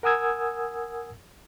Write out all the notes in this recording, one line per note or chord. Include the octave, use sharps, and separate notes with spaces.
A#4 F#5 G#5 D#6 E6 G#6